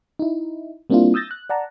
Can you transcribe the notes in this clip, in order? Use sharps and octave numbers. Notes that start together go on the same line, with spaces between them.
D#4 E4
G3 A#3 C4 D4 E4 F4
D#6 E6 G6 A6 A#6
F#6
D5 F#5 A5 A#5